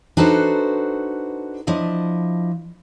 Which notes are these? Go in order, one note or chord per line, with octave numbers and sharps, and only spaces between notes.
D4 D#4 F#4 A4 B4 C5
F3 D4 E4 D#5